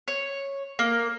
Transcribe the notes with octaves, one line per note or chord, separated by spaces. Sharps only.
C#5
A#3